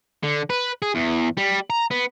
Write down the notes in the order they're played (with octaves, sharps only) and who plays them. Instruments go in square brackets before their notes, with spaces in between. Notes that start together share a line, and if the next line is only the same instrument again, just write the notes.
[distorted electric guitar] D3
B4
G#4
E2
G3
A#5
B3